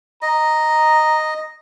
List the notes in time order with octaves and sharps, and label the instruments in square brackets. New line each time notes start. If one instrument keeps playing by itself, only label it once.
[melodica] D#5 [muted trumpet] A#5